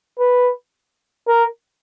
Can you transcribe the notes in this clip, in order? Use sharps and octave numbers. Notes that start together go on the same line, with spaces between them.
B4
A#4